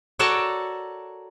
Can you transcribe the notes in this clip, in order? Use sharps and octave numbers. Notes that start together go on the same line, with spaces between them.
F#4 A4 A#4 C#5 D5 A5